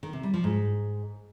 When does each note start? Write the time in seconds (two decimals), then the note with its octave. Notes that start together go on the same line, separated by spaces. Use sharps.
0.03 D#3
0.13 C3
0.23 G3
0.34 F3
0.44 G#2